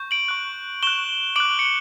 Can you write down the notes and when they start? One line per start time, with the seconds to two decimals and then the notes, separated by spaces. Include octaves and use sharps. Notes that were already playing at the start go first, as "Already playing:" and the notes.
Already playing: C#6 G6
0.11 D7 F#7
0.28 C#6 F#6
0.83 C#6 F#6 E7 G7
1.36 D6 F#6 D7 F#7
1.59 C#7